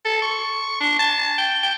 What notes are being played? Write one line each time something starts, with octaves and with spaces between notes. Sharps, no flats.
A4
C#6
D4
A5
G5
G5